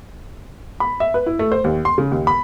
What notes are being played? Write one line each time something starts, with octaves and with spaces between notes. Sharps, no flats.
B5
E5
B4
E4
A3
C5
D#2
C6
C#3
D#2
B5